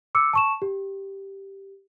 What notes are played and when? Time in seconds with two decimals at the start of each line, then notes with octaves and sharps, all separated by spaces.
0.15 D6 E6 C#7
0.33 A5 C#6 E7
0.62 G4